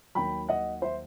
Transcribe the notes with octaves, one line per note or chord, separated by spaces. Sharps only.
D#2 D#3 F#3 G5 B5
D#5 F#5
C5 E5